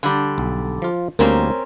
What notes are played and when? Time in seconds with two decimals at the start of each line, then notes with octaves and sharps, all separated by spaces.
0.03 D3 G3
0.38 B1
0.82 F3 F4
1.19 D2 G3 A#3 C4 C#4 A#4